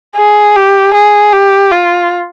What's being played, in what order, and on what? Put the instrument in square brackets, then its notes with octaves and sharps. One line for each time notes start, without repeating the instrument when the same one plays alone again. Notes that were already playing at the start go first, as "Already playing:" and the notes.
[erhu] G#4
G4
G#4
G4
F4